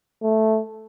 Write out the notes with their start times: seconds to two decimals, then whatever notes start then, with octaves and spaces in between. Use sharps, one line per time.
0.23 A3